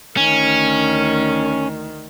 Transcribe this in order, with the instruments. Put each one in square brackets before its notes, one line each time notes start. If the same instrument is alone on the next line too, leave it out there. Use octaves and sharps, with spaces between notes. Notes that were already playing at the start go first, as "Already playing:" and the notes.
[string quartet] D2 D#3 [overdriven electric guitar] C#4